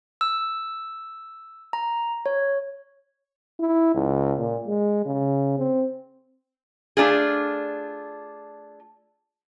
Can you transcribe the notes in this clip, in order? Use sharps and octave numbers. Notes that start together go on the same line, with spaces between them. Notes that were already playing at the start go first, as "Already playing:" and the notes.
E6
A#5
C#5
E4
C#2
A#2
G#3
C#3
C4
A3 D4 F4 G#4